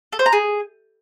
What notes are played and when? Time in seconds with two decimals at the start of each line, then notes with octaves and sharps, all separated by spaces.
0.13 A4
0.19 C5
0.26 A#5
0.33 G#4